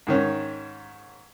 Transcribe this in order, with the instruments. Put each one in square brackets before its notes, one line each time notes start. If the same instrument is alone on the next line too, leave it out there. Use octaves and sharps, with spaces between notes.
[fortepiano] G#2 D#3 C#4